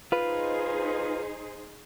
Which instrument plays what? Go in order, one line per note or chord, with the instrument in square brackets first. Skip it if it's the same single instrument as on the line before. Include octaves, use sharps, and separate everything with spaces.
[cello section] D#4 G#4 C5 [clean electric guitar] F4 B4